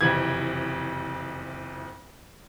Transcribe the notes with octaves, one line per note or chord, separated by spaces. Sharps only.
F#1 F2 C3 E3 G#6